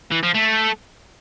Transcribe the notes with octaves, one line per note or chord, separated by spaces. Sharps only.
E3
F3
A3